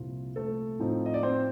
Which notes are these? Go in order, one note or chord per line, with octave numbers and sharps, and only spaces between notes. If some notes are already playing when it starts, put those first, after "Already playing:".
Already playing: C2 A#2 F3 F4
A3 A4
A2 F3 C4 D#4
D#5
D5
C4 C5